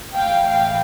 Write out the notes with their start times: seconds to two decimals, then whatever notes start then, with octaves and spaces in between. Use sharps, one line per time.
0.15 A2 E3 F5 G5
0.47 F5 G5